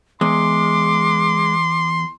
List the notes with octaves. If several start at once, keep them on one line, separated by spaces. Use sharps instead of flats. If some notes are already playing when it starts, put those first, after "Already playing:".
E2 G#3 C6 D6